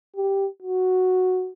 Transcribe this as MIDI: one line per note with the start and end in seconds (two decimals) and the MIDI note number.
0.16 0.47 67
0.62 1.50 66